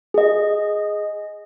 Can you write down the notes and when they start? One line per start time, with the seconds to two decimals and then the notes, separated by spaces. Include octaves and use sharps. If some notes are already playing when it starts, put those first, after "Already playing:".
0.14 G#4 D#5